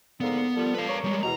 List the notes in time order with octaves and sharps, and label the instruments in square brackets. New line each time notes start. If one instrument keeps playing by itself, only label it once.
[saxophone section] G#2 D3 A#3 [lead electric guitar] B3
[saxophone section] F3 G3 A4
[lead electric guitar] B4 F5
[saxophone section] A#4 C#5
[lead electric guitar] G3 G#3
[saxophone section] E2 B2 [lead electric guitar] A#5